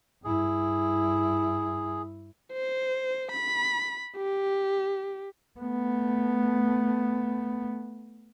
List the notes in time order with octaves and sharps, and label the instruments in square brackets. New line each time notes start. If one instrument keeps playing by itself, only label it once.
[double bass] G2 E4 [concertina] G#4
[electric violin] C5
B5
G4
[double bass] A3 B3